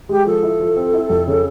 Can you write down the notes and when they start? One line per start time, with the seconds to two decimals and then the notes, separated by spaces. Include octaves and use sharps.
0.09 G#3 G4
0.26 F3 A4
0.43 E4
0.60 F3
0.76 C4
0.93 E4
1.10 F2
1.27 C#3